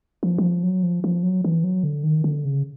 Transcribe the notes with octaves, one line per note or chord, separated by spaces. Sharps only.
F3
F#3
F3
F#3
F3
F3
F#3
E3
F#3
D3
D#3
D3
C#3